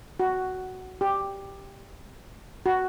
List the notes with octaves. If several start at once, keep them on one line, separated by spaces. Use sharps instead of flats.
F#4
G4
F#4